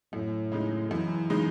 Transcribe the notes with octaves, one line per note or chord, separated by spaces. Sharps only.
F#2 A2
C#3 G#3 D#4
F#2 E3
C#3 G#3 D#4